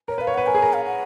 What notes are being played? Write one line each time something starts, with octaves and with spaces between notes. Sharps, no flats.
A#4 C#5
B4 F5
C#5
B4 F#5
A#4 G#5
G#4
A#4
F5
F#5